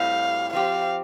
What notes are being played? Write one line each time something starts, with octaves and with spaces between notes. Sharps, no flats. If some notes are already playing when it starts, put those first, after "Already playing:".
Already playing: A2 G3 C4 F5
F3 C4 G4 F5